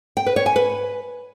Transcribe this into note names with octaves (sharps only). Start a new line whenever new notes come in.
G5
B4
C#5
G#5
B4